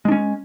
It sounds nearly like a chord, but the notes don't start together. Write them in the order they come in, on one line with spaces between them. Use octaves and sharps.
G#3 D4 C#4